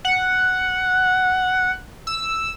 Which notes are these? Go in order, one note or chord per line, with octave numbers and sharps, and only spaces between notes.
F#5
E6